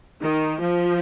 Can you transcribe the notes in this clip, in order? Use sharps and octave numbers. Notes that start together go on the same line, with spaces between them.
D#3
F3